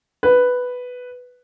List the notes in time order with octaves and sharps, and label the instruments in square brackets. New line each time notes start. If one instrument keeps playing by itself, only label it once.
[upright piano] B4